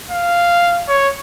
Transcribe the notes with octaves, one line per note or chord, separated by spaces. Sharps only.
F5
C#5